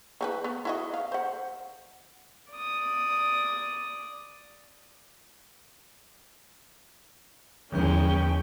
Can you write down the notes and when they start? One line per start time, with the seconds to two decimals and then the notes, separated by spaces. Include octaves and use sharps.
0.21 E3 F#4 B4
0.44 B3
0.65 E4 F#4 D#5
0.94 F5
1.12 C5 F#5
2.53 D5 D#6
7.72 E2 D3 F3 G#3 A#3 C#4 G5 G6